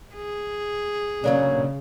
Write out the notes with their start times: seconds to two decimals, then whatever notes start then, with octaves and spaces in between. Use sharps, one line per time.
0.14 G#4
1.24 C#3 F#3 A#3 D4 C#5